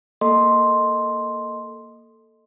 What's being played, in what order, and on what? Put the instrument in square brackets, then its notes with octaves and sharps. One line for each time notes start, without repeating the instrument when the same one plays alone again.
[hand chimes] A#3 A4 D#5 C6